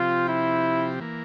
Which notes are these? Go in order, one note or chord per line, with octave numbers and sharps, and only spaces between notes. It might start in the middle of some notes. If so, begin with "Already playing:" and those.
Already playing: C3 F3 C4 F4 G4
E4
E3 A#3